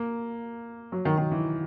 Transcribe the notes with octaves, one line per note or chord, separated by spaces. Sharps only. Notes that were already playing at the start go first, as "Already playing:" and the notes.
Already playing: A#3
F#3
D#3
D#3
E3